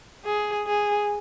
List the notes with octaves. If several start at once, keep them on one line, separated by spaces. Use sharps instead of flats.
G#4
G#4